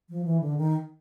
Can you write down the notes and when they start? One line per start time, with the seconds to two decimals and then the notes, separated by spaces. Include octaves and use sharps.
0.09 F3
0.25 E3
0.41 D3
0.57 D#3